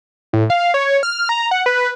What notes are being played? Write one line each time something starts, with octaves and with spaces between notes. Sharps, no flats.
A2
F5
C#5
F6
A#5
F#5
B4